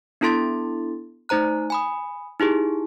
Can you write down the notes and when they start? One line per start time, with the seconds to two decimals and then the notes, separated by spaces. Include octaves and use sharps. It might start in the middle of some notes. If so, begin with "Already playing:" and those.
0.21 B3 D4 E4 A4 C6 A6
1.29 A3 D#4 C5 A#5 F#6
1.70 G#5 B5 D#6
2.40 D#4 E4 G4 G#4